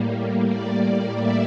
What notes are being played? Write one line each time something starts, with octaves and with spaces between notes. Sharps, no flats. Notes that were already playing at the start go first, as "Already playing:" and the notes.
Already playing: A2 G3 A#3
A2 G3 A#3 D5
E5